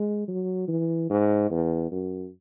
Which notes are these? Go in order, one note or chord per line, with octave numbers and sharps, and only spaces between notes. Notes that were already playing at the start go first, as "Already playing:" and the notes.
Already playing: G#3
F#3
E3
G#2
E2
F#2